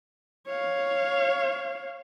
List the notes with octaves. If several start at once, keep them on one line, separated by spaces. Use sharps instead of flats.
C#5 F5